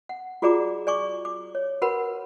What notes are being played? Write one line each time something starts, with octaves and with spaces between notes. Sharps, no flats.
F#5
F4 F#4 G#4 D5 A#5 D6
D5 G#5 C#6 D6
D6
C#5
F#4 A#4 B4 F#5 B5